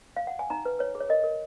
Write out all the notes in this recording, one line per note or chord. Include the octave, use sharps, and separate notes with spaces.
F5
F#5
G#5
D#4 A#5
B4
B4 C#5
G#4
C#5
A#4 D#5
A#4